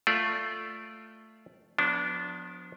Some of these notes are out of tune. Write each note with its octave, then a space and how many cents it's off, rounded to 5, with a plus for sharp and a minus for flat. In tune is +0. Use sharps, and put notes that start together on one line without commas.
A3 +5 F4 +0 D5 -10
F3 +40 B3 +0 D4 -20